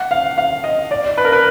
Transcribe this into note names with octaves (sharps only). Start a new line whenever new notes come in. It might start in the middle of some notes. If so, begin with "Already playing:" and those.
Already playing: F#5
F5
F5
D#5
D5
B4
A#4
B4